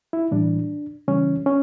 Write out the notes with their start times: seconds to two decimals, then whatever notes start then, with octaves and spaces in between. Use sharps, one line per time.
0.13 E4
0.31 A2 E3 G3 D4
1.08 C#3 E3 G3 C#4
1.46 C#4